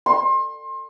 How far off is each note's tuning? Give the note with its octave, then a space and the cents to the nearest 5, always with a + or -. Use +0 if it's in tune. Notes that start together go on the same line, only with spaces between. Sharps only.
C6 +30